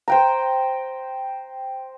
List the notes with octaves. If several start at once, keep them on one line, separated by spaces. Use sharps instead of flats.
C5 G5 A#5